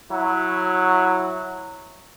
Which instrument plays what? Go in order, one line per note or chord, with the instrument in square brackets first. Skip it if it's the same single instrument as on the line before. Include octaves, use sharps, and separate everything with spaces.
[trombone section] F#3 E4